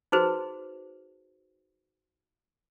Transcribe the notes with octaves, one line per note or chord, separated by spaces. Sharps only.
D#4 F#4 G#4 B4 C5